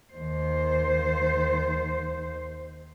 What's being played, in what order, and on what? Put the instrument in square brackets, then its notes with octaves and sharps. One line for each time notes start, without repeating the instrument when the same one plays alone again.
[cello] D#2 C5